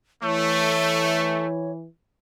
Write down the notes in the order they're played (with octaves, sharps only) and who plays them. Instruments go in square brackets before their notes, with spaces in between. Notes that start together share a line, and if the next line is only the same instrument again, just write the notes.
[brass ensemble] E3 [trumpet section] A3 [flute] C#5